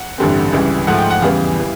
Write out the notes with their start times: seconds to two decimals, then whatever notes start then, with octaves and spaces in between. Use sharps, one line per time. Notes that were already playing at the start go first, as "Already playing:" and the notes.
Already playing: F#5
0.18 A1 G2 D3 G3 C4
0.53 C#2 C#3 E3 G3
0.87 G#2 F3 A3 F#5
0.98 G5
1.10 F#5
1.21 E2 C#3 E3 G3 B3 F5
1.58 E3 G3